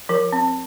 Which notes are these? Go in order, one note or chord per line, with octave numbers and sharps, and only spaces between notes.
F3 A#4
C4